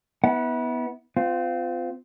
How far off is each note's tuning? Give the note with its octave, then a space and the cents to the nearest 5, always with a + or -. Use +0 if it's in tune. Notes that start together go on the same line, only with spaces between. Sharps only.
B3 +0 E4 -30 F#5 +0
C4 -30 F4 +0